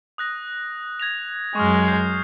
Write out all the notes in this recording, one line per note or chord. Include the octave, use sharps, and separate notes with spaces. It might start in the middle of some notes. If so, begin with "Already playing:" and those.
D#6 F#6 A#6
G#6 A#6 F7
F#2 G#3 C#6 D#6 F6
G6 C7